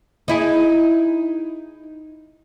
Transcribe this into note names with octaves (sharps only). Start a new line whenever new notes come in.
D#4 E4 G#4